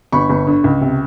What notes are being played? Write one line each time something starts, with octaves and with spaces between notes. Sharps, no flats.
G1 B5 C#6
G1
D3
C#2
C3